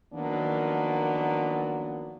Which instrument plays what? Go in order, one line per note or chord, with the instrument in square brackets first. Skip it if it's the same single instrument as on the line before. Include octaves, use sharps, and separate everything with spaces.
[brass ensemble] D#3 F3 F#3 A#3 B3 D4